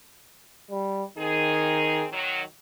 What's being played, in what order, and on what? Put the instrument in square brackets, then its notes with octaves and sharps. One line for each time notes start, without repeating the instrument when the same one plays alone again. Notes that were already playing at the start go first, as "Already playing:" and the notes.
[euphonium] G3
[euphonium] D#3 [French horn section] C4 D#4 G#4
[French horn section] D#3 F#3